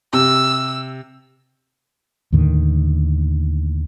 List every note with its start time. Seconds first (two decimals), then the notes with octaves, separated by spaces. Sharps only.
0.13 C3 E6
2.32 D#2 A2 D3 D#3